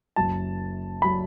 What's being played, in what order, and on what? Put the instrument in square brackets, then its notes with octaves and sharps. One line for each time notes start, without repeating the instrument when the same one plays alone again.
[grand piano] F#1 F#2 F#3 A5
F#3 B5